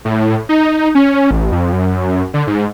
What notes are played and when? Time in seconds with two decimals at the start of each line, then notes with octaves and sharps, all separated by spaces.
0.05 A2
0.49 D#4
0.95 C#4
1.31 A1
1.52 F2
1.73 F#2
2.34 D3
2.47 G#2